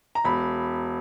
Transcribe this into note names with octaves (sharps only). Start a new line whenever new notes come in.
A#5
E1 B5